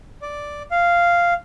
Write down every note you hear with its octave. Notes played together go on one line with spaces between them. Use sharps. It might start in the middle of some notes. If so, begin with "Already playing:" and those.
D5
F5